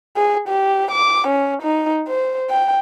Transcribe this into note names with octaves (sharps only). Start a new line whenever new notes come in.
G#4
G4
D6
C#4
D#4
C5
G5